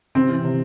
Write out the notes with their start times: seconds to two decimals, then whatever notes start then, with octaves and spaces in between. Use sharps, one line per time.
0.15 C3 C4
0.29 E3
0.44 C3